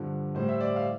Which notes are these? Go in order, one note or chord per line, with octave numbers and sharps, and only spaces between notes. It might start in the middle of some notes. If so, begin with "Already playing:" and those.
Already playing: G2 D3 F3
A2 G3 C5
E5
D5
F5